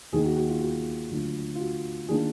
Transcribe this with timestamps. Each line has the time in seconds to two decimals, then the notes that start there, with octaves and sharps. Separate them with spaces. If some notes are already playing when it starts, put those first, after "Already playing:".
0.12 D#2 D#3 A#3 D#4 G#4
0.25 F#4
0.37 F#4
0.49 F4
0.61 F#4
1.10 D2 D3 F#3 D4 F4
1.55 F4
1.59 F#4
2.08 D#3 A#3 D4 F4 G#4